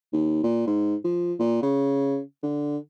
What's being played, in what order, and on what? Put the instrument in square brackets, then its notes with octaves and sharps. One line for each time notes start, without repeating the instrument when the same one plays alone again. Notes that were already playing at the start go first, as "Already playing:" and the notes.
[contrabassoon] D#2
A#2
G#2
F3
A#2
C#3
D3